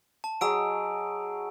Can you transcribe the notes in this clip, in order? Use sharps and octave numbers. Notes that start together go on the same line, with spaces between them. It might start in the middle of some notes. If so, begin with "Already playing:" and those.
A5
F#3 G#4 D#5 A#5 E6 D7